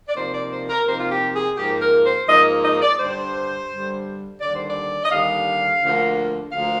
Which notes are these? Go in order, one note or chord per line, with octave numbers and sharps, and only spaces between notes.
D5
C3 F3 A#3 D#4 C5
D5
C5
A#4
C3 F3 A#3 D#4 C5
F4
G4
G#4
G#2 F3 A#3 G4
A#4
C5
G#2 F3 A#3 D#5
D#5
D5
G2 D3 G3 C5
G2 D3 G3
D#2 D3 G3 D5
C5
D5
D#5
D#2 D3 G3 F5
D2 D3 F3 A#3
D2 D3 F3 A#3 F5